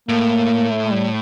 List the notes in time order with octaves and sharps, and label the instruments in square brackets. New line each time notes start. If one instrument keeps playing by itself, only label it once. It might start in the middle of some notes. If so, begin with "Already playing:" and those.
[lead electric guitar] A2 [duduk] A#3
[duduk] A3
G3